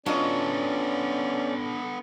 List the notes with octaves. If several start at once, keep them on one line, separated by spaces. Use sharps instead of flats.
F#3 B3 C#4 D4 F4 A4 D5 D#5